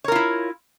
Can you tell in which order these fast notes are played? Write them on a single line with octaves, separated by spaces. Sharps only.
C#5 A#4 F4 E4